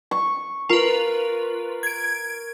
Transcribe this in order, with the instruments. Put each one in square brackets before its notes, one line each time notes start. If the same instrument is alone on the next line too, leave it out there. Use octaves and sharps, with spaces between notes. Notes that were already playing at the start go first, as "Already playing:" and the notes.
[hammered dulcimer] C#6
[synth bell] F4 B4 [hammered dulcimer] A#4
[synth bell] G#6 D7